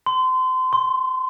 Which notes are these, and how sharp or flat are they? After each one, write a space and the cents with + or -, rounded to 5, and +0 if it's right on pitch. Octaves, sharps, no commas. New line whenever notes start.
C6 -30
C6 +20